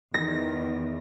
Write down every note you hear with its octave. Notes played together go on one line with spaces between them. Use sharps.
E2 D#3 A#6